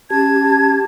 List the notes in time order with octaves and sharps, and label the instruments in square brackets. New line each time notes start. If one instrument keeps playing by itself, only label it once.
[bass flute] C#4 [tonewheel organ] G4 [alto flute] A5 [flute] G#6